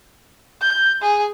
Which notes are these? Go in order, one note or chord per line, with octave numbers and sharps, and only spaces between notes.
G6
G#4